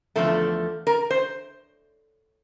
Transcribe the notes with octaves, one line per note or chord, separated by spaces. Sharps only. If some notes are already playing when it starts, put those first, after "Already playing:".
E2 D3 F3 A3 A4
A#4
C5